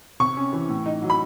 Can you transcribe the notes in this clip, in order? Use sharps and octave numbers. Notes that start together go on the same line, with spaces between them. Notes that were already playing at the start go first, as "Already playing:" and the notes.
C3 C#6
C#4
E3
A2
D#4
F#3
B5